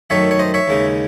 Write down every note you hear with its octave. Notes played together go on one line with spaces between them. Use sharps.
F#2 D#3 A3 D#4 C#5 E5
C#5
C5 D#5
C#5 E5
D#2 C#3 G#3 D#4